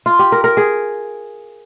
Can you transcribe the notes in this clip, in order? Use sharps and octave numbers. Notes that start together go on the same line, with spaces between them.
F4
G4
A#4
A#4
G#4